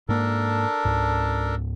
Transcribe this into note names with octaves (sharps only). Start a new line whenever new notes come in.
G#2 A#3 D4 A4 A#4
C#2 G#2